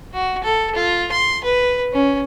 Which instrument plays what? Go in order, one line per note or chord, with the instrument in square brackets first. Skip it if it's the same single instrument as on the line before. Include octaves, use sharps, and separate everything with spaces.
[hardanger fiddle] F#4
A4
F4
C6
B4
C#4